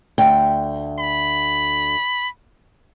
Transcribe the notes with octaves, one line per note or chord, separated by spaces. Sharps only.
D2 G5
B5